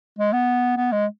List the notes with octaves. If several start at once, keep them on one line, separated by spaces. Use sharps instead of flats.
G#3
B3
B3
G#3